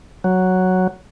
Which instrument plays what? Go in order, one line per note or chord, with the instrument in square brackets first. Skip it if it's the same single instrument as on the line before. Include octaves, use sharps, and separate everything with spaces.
[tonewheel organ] F#3